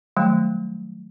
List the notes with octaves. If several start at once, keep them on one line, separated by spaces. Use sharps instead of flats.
D#3 F#3 G3 A3